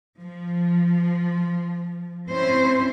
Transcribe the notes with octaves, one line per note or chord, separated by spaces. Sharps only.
F3
C4 C#4 E4 C5